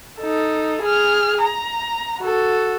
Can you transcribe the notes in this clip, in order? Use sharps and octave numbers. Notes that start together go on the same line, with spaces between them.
D#4 A4
G#4 F6
A#5
F#4 A4